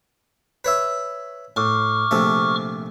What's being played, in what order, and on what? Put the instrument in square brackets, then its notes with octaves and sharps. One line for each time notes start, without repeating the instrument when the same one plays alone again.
[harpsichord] B4 C#5 E5
[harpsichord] A2 [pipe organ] C#6 D6 F6
[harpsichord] A#1 C3 A3